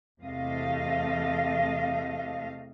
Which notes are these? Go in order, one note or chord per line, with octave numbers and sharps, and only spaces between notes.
E2 C3 A3 D#5 F5